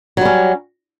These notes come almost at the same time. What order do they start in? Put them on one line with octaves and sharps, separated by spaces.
F#3 G3 C#4